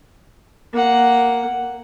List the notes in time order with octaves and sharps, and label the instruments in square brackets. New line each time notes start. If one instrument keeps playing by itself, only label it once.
[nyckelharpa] A#3 F#5